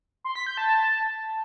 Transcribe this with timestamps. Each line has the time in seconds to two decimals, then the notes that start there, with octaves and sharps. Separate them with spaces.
0.24 C6
0.35 B6
0.46 G6
0.57 A5
0.68 A5